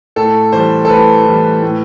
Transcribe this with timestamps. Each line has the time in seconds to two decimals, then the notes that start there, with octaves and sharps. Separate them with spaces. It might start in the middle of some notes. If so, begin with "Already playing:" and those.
0.16 A2 A4
0.52 E3 G3 C5
0.85 A4
0.89 A2 B4
1.26 E3 G3
1.62 A2